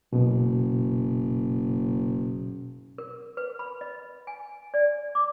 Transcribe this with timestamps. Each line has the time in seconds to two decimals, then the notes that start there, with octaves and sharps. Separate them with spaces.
0.13 F#1 B2
2.98 A#4
3.37 B4
3.59 B5
3.81 D#5
4.27 G#5
4.74 D5
5.15 D6